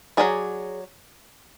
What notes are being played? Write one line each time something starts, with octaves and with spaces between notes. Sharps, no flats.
F#3 C#4 G#4 D5